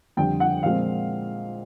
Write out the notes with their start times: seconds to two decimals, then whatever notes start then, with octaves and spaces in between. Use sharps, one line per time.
0.17 F2 D3 G3 G5
0.40 F#5
0.63 A#2 F3 G#3 C4 F5